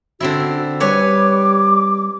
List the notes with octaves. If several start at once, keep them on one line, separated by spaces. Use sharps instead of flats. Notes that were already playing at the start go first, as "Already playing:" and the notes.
D3 C4 E4 F#4
G3 B4 C#5 G#5 D6